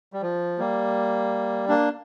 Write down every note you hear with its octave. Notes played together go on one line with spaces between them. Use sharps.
G3
F3
G3 A#3
A#3 D4